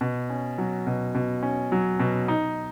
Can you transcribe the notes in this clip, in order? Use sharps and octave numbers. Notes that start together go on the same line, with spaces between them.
B2
C#4
F#3
B2
B2
C#4
F#3
B2
D#4